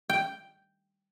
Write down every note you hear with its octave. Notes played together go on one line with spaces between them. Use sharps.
G5